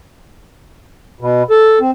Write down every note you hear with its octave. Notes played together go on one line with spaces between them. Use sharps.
B2
A4
C4